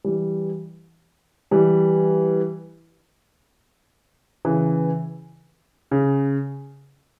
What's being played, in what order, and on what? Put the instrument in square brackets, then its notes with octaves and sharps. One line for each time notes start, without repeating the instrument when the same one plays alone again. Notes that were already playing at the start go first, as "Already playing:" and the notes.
[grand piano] E3 G3
E3 G3
C#3 E3
C#3